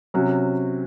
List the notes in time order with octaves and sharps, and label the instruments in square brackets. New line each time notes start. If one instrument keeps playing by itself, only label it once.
[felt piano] C3 F#3 C#4 F#4